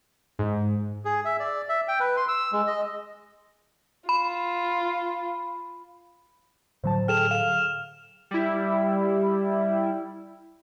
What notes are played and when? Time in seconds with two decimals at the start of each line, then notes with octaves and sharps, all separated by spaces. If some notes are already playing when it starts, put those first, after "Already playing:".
0.39 G#2
1.05 G#4
1.25 E5
1.40 D5
1.69 E5
1.88 G5
2.00 B4
2.17 C6
2.28 E6
2.52 G#3
2.67 D#5
4.09 F4 B5
6.84 A2 D3 F#3 C5 A5
7.08 G#4 A4 G5 F6 E7 F7
7.31 F5 E7
8.31 G3 E4